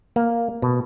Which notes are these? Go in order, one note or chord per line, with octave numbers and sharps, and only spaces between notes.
A#3
B2